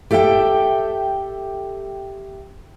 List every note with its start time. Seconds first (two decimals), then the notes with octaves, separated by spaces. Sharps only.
0.11 G4 A4 E5 F5 G5